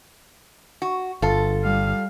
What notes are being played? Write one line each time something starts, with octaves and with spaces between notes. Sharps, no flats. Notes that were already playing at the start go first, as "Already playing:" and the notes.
F#4
G1 F4 A4
G3 F5